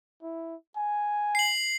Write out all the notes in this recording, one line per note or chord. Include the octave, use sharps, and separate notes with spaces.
E4
G#5
C7 F#7